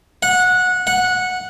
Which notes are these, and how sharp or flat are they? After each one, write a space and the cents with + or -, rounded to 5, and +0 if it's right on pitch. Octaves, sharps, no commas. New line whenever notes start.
F#5 -20
F#5 -15